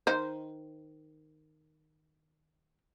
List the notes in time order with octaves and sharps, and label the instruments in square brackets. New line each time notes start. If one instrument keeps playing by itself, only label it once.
[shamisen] D#3 C5